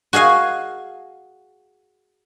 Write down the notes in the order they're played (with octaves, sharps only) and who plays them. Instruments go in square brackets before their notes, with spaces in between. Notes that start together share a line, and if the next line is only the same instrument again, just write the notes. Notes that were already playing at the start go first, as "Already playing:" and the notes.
[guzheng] F#4 G#4 D#5 F5 G#5